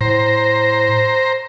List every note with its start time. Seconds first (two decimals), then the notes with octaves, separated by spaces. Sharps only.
0.01 A2 C5 A#5